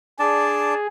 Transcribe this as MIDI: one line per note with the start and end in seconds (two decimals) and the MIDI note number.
0.19 0.74 62
0.19 0.87 68
0.19 0.74 74
0.19 0.74 81